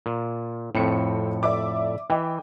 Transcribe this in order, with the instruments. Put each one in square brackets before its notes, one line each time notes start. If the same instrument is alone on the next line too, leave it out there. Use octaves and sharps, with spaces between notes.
[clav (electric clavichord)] A#2
[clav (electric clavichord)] F2 A2 [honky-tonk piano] C4 C#7
[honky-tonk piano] D5 E5 D6
[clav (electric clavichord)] E3 [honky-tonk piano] D#5 G5